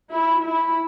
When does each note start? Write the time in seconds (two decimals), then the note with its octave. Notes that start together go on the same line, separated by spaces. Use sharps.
0.11 E4
0.41 E4